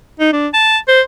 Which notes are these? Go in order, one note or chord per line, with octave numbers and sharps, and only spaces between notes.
D#4
D4
A5
C5